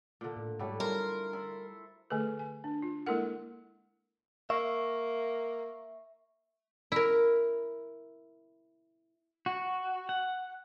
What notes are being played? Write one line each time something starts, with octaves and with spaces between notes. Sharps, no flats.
A#2 D3
A2
G#2 D3 F#3 G3 A3
G3 E4 F4 A#4 C5
E4 A4 E5 C6
D3 A3 A4 B4
G#5
D4
F4
G#3 A#3 E4 A4 A#4 F#5
A#3 E5 C#6
E4 A#4
F#4
F#5